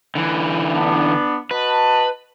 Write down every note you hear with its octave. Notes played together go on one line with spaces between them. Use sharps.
D3 E3
B3 D4
F#4 B4 D#5 A5